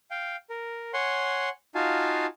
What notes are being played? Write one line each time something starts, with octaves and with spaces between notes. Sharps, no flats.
F5 G5
A#4
C#5 F#5 G#5 C6
D#4 F4 F#4 F5 G#5 A5